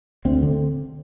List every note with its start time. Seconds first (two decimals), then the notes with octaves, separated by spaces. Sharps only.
0.25 D2 C4
0.42 D3